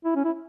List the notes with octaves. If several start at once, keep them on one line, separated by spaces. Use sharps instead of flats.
E4
C#4
E4